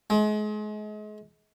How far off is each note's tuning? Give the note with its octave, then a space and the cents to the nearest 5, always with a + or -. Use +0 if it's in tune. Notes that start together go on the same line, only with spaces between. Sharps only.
G#3 +35